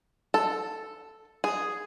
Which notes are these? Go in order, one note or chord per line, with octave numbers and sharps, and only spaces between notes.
A4
G#4